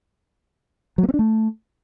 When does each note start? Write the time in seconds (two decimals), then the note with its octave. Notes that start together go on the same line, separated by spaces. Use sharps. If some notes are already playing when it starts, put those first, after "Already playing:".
0.98 F#3
1.03 A#3
1.09 C4
1.14 D4
1.19 A3